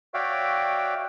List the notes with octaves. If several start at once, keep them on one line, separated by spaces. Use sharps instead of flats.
F#4 C#5 D5 E5 F5 G5